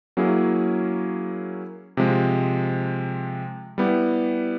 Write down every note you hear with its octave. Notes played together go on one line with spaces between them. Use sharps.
F#3 A#3 C#4 E4 G#4
C3 F3 G#3
G3 B3 E4 G4